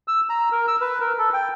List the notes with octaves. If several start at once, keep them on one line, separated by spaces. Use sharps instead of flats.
E6
A#5
A#4
E6
B4
A#4
A4
G5